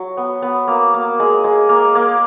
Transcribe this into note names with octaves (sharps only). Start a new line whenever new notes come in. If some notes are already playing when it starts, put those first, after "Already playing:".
Already playing: F#3
B3
B3
A#3
A#3
G#3
G#3
A#3
A#3